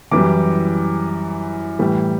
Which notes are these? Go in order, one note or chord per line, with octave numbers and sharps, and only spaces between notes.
F#2 E3 G3 D6
A2 E3 G3